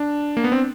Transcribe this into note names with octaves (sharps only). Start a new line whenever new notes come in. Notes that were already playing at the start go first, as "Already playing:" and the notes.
Already playing: D4
A#3
B3
C4